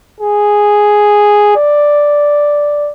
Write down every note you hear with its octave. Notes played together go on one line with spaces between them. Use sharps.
G#4
D5